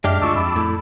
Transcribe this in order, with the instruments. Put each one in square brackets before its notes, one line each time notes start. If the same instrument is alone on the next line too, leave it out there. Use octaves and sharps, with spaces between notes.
[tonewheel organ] F#2 F6 [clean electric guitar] G#3 D4 G4 [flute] E5
[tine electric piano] D2 F4 [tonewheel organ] A5 D6 E6 [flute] C#6
[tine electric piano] F2 [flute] B5
[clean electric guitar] A2